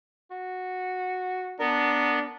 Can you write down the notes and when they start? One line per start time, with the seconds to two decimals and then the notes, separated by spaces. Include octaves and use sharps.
0.31 F#4
1.60 B3 D4 A#4